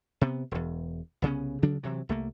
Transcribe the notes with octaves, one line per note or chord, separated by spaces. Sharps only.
C3 B3
E1 E2
C2 C#3 B3 C#4
D2 C#3 F#3 D4
C3 E3 F#3
C2 A3 A#3